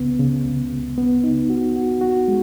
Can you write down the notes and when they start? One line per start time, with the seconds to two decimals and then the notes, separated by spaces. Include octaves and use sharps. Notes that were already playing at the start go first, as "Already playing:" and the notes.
Already playing: C#2 C#3 B3
0.20 C#3
0.45 C#2
0.72 C#2
0.98 B3
1.24 D#4
1.50 F#4
1.76 F#4
2.01 F#4
2.28 G#3